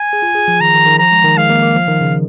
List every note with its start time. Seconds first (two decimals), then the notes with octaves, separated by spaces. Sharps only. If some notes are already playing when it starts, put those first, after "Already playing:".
Already playing: G#5
0.13 G#4
0.22 F4
0.35 G#4
0.48 F3
0.60 D#3 A#5
0.74 D#3
0.86 D#3
0.99 F3 A#5
1.12 G#3
1.24 D#3
1.37 G#3 F5
1.50 A#3
1.62 A#3
1.76 F3
1.88 D#3
2.01 C#3